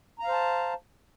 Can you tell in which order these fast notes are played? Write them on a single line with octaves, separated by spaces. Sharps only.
A#5 F5 C5 A5